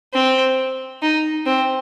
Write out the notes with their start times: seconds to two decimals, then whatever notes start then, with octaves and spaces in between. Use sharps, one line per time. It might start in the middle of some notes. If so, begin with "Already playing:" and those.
0.14 C4
1.02 D#4
1.46 C4